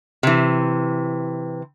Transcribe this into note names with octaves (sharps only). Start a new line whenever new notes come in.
C3 E3